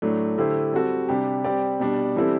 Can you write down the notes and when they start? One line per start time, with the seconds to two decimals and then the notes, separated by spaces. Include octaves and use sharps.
0.02 A2 F#3 A3 D4
0.38 D3 A3 E4 G4 C5
0.73 G3 C4 F#4 A4
1.09 C3 G3 D4 G4
1.44 G3 C4 G4 D5
1.80 B2 G3 D4
2.16 E3 G3 C4 E4 A4